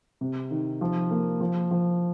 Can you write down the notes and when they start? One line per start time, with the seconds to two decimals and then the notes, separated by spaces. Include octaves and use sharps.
0.21 C3
0.51 D#3
0.81 F3
1.11 A#3
1.41 F3
1.71 F3